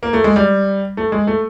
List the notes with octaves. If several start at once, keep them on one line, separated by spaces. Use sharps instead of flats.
A#3
A3
G#3
G3
A3
G#3
A3